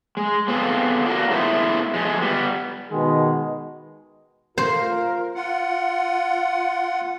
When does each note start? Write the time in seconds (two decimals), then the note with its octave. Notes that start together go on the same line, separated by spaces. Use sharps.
0.17 G#3
0.48 B3 C4 F4 G#4 A4
1.06 D4 F4 F#4 A#4
1.29 F#3 G#3 A3 B3 E4 C5
1.94 F3 G#3 A3
2.21 G3 B3
2.90 B2 D#3 G#3
4.58 F4 A#4 C5
5.35 F4 F#5